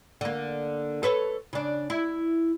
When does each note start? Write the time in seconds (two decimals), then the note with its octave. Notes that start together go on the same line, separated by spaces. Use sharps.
0.21 D3 A#3
1.03 A4 B4 C#5
1.53 C#3 D4
1.90 E4